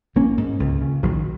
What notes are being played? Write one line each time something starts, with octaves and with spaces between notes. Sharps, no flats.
A#1 A#3 C#4
G#2
C#2
C#3
A#1 D#3 F#3